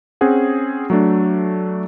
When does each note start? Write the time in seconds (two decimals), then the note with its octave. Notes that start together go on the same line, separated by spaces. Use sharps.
0.21 C4 C#4 G#4 F#5
0.90 F#3 A3 D4